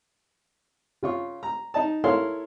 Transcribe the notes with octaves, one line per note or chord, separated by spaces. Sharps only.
C#3 F4 C#6
A#5
D#4 D#5 A5
E4 A4 A#4 C#5 F5 C6